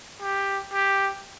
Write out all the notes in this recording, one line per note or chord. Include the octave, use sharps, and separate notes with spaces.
G4
G4